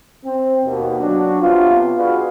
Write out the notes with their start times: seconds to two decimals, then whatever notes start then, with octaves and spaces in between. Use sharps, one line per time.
0.24 C4
0.64 D#2 B2
0.99 F#3 D4 F#4
1.41 C3 B3 C4 F4
1.97 F4 F#4 G#4 B4 D5 F5